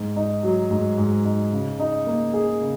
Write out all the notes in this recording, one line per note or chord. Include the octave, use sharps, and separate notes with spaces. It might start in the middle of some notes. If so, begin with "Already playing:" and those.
Already playing: G#2
D#4
F#3
G#2
G#2
D#4
C#3
D#4
A#3
G#4
C#3